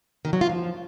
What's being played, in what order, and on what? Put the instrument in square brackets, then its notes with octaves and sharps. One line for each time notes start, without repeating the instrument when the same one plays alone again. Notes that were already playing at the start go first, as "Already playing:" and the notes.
[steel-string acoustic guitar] D#3
F#3
F4
F3